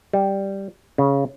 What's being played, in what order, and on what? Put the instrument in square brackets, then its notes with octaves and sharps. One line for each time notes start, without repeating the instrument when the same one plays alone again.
[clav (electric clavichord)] G3
C#3